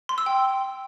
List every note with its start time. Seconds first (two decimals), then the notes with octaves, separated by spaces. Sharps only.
0.09 C6
0.18 E6
0.26 G5